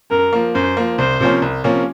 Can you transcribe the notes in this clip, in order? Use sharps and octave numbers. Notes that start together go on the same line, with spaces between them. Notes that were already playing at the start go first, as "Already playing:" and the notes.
F#2 A#4
F3 A#3
F#2 C5
F3 A#3
C2 C5
C3 F3 A#3 C#4
C2
C3 F3 A#3 C#4